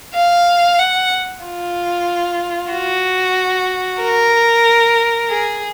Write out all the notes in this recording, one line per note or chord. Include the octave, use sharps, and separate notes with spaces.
F5
F#5
F4
F#4
A#4
G#4